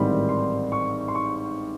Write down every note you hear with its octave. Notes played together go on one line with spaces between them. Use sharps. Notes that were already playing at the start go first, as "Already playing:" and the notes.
Already playing: A1 G#2 D#3 G3 C4 B5
C6
C#6
C6
C#6